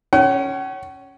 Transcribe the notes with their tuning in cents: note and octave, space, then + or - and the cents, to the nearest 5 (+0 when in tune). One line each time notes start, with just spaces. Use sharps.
C#4 +0 F#5 +45